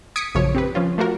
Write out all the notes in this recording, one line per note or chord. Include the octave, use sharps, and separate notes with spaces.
D#6 G#6 B6 C#7 D7
A#1 F#2 C#3 F3 C#5
C4 G4 B4
F3 C#4 F4
A3 A#3 F4 F#4 A#4